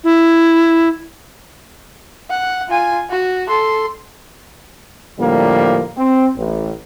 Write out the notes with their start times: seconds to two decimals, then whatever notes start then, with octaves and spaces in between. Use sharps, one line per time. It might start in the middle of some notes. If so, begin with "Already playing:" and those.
0.04 E4
2.30 F#5
2.68 F4 G#5
3.10 F#4
3.48 A4 C6
5.19 A2 D3 F3 G3 A#3
5.97 C4
6.36 A1